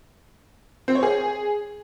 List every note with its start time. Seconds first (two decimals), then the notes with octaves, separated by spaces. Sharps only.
0.88 C4
0.95 C#5
1.03 G#4